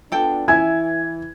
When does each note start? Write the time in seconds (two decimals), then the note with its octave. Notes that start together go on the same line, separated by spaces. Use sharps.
0.12 B3 D4 F4 A4 G5
0.48 E3 E4 E5 G#5 G#6